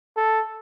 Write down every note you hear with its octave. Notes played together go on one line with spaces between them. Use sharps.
A4